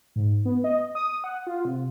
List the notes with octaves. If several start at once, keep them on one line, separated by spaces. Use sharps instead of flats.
G#2
B3
D#5
D#6
F#5
F4
C3